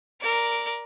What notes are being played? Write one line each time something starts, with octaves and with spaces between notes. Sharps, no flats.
A#4 D5